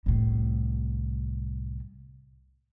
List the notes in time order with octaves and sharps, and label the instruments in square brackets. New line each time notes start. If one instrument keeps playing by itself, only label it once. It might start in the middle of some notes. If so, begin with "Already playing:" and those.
[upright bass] C2 A2